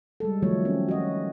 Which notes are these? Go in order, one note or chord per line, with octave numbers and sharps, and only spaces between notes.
G3 G#3 A4
D#3 F3 F#3 A3 C#5
C4 C#4
F#4 D#5